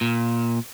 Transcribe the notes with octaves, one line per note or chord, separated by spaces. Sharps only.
A#2